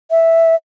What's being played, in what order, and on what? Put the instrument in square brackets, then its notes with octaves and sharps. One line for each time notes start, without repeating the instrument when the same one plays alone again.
[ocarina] E5